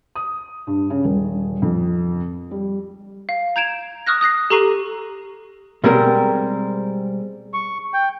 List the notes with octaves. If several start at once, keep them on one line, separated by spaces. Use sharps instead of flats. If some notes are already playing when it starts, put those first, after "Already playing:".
D#6
G2
C#3
D#1
F2
G3
F5
A#5 G6 G#6 D7 E7 F7
C#6 D#6 F6 F#6 A#6
D#6 F#6 A#6 C7
G4 A4 A#5 C#6 C7 D#7
B2 G3 G#3 C4 G4 A#4
C#6
G5